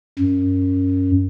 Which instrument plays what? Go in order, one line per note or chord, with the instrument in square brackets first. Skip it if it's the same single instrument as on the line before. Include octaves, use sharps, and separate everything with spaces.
[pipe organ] F#2